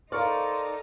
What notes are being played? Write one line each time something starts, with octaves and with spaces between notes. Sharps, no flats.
D#4 A4 A#4 C5 D5 F5 C#6 F6